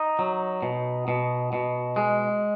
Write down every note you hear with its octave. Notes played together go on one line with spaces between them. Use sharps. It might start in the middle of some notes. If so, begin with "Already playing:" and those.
Already playing: D#4
F#3
B2
B2
B2
G#3